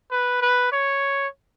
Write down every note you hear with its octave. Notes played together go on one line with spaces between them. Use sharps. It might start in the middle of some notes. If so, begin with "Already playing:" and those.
B4
B4
C#5